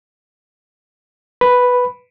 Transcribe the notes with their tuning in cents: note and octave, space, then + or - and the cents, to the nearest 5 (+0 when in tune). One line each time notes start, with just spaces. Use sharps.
B4 +0 B5 +0